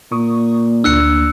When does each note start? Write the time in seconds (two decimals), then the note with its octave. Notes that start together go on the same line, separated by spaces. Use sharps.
0.12 A#2 A#3 C#6 D#6
0.84 D2 D4 E6 F#6 C#7